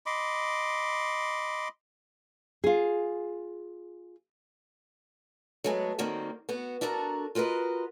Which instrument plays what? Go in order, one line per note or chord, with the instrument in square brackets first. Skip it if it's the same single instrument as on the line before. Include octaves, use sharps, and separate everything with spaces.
[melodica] D#5 B5 C6 D6
[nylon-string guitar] F4 G#4
[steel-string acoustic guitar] F#3 G#3 A3 B3 G#4
D#3 G3 A#3 C4 F#4
B3 F#4
D4 E4 F#4 A4 A#4 A#5
F4 F#4 A#4 B4 D#5